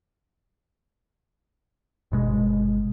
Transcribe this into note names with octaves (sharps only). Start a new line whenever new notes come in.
G1 B2 G#3